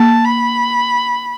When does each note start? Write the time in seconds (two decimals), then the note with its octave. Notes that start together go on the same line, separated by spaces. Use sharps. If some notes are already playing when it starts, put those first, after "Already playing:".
Already playing: A#3 A5
0.25 B5